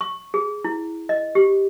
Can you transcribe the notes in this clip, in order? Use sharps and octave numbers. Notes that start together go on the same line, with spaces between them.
C#6
G#4
E4
D#5
G4